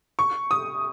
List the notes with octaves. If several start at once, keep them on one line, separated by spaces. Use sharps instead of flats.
C#6
D#6